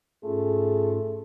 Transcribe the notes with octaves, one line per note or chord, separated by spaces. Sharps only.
G#2 A3 C#4 F4 G#4